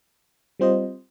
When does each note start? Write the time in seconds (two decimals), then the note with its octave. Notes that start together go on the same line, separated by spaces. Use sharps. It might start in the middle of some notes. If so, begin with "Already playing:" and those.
0.59 G3 C4 F4 C5 D#5